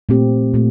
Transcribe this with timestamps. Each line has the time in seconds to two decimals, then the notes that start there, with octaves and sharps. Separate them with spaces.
0.09 A#2 A3 C4 G4
0.54 A#2 A3